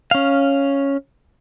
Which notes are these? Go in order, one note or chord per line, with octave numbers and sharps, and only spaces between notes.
C#4 F5